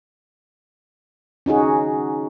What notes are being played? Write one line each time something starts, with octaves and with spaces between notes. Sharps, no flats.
C#4 D#4 F#4 G#4